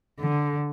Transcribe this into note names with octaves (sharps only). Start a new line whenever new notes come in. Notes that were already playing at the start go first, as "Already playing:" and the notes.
D3